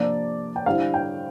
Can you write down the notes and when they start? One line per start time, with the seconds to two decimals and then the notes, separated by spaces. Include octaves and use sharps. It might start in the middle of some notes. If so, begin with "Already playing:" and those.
Already playing: C3 F3 A#3 D4 D5
0.56 G5
0.66 D3 G3 C4 E4 F5
0.94 G5